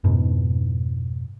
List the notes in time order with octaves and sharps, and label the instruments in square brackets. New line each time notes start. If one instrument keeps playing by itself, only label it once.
[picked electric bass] F2 G#2 B2